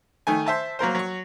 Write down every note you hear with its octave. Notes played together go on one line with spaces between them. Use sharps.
D#3 A3 G#5
C5 E5 A5
F#3 A#3 A#4 C5
F#3 C#6